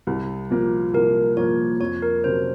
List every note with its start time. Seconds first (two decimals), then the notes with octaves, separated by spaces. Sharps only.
0.07 C2
0.51 A#2 F3 A#3
0.93 C2 A#4
1.37 A#2 F3 A#3 C#5
1.80 F2 C#5
2.02 A#4
2.24 C3 F#3 C#4 C5